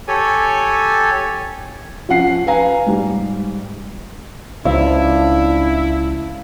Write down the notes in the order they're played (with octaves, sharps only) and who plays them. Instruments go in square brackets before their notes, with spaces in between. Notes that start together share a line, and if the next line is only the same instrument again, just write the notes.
[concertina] G4 A4 C#5 G#5
[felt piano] F3 C#4 F#5 C7
B4 F5 G#5 A#5
G#2 G3
[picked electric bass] C#2 [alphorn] D4 [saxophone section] E4 [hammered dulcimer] F5